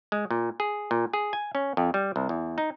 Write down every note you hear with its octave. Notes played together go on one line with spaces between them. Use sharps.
G#3
A#2
G#4
A#2
G#4
G#5
C#4
F2
G3
C2
E2
D#4